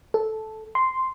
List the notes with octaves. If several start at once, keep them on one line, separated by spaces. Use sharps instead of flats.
A4
C6